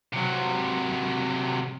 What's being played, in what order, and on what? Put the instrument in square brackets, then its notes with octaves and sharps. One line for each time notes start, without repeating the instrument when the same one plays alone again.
[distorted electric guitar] C3 F#3